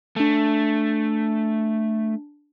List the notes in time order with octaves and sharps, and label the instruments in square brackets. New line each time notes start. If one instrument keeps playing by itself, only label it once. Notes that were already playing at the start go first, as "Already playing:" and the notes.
[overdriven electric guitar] A3 [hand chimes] D4 A5